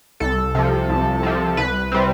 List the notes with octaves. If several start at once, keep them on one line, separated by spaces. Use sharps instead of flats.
C2 A4
C3 F3
C2
C3 F3
C2 B4
C3 G3 C4